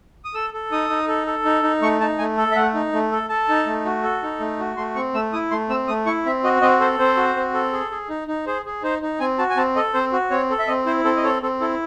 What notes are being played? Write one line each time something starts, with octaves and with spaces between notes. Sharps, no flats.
D#6
A4 E6
A4
D#4 D#6
D#4
A4
A4
D#4
D#4
A3 C#6
D#4 A5
A3 G#5
A4
E5
A3 F#5
D#4
A3
A4
A4 A5
D#4
A3
F#4
A4
D#4
A3
F#4
A3 C6
C4 C#6
A3 E6
E4 D#6
A3 C6
C4 E6
A3 D#6
E4 C#6
C4 E5
F#4 D#5
C4 D#5
A4 C5
C4 C5
F#4
C4
A4
G#4
G#4
D#4
D#4
G#4 C5
G#4
D#4 C5
D#4
C4 G#5
F#4 A5
G#5
C4 A5
A4 D#5
C4 C5
F#4
C4 C#5
A4
E5
C4 D#5
E4 C5
C4 A4
D#5
A4 C#5
C4 A4
E4 A4